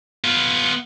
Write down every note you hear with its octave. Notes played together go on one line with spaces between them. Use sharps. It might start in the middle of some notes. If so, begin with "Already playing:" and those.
B3 F4